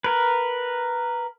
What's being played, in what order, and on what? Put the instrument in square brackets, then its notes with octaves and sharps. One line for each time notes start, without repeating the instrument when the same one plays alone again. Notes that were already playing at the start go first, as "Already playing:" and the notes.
[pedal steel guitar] A#4 B4